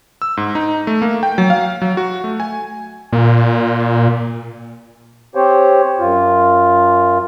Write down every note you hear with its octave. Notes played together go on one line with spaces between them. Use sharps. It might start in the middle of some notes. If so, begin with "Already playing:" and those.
E6
G#2
D#4
A3
A#3
G5
F#3
F5
F#3
F#4
A3
G#5
A#2
C4 G4 C5 C#5
F#2 F4